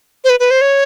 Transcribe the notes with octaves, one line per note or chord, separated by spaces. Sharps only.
C5
B4
B4
C5
C#5